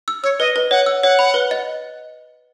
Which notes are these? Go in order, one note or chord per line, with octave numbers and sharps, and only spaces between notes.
E6
C#5 E6
B4 D#5
B4
C#5 F#5
E6
C#5 F#5
B5
B4
D#5